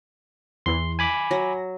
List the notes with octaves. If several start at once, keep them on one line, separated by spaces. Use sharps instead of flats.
E2 E3 C6
G#5 B5 D6
F#3 A#6